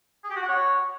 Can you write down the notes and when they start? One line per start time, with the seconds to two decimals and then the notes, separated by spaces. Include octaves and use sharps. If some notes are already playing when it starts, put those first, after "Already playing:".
0.24 G#4
0.30 G4
0.36 F#4
0.42 F#5
0.49 C#5